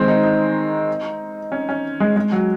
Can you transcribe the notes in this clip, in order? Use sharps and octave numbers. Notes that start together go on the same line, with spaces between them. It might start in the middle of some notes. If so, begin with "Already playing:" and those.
Already playing: D#3 G#3 C4
D#4
D#4
C#4
C#4
G#3
G#3
F#3